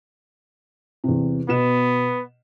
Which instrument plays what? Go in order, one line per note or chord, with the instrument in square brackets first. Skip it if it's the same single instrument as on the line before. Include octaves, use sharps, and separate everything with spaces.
[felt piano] E2 C3
[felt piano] B2 E7 [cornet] B3